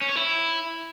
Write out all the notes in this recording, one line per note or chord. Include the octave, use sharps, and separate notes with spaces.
C#4
C#5
E4